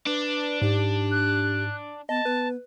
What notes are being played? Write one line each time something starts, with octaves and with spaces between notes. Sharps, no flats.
D4 B4
G#2 G4
F#6
B3 D#5 A5
B3 B4